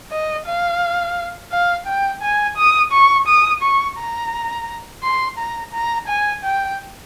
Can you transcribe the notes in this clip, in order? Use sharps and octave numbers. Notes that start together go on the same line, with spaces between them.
D#5
F5
F5
G5
G#5
D#6
C#6
D#6
C#6
A#5
C6
A#5
A#5
G#5
G5